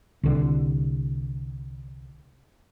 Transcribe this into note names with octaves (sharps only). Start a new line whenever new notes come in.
C2 D3